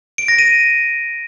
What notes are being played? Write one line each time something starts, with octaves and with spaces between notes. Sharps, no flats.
D7
A#6
D#7